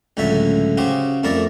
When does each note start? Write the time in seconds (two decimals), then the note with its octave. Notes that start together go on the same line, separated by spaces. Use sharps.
0.17 C#2 A2 D3 F#3 E5
0.77 C#3 F#4 G4 C5
1.23 F2 A3 E4 A#4 D5